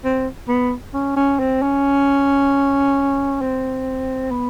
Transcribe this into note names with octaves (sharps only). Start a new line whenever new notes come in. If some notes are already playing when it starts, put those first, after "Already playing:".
C4
B3
C#4
C#4
C4
C#4
C4
B3